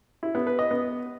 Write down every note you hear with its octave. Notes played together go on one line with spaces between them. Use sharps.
E4
B3
B4
D#5
B3